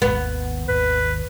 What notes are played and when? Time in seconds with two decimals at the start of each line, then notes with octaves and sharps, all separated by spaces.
0.02 G#1 D#2 B3
0.68 G#1 D#2 B4